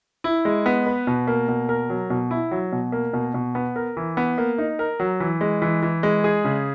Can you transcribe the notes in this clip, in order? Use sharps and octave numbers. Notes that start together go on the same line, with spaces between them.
E4
G#3
B3
B4
B2
A#3
B2
A#4
F#3
B2
E4
F#3
B2
A#3
B2
B2
B3
A#4
E3
B3
A#3
D#4
A#4
F#3
E3
G#3
E3
E3
G#3
G#4
C#3